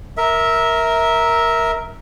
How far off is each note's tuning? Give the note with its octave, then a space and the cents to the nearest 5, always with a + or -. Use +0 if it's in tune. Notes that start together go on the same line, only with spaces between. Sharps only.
A#4 +0 E5 -15